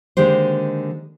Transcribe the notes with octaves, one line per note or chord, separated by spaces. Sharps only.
D3 D#3 G#3 A#3 G4 C5